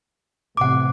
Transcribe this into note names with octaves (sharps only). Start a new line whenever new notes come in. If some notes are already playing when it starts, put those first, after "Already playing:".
A1 C3 F#5 D6